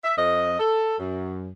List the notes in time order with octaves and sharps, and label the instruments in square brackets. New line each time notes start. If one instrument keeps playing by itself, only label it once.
[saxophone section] E5
F2 D#5
A4
F#2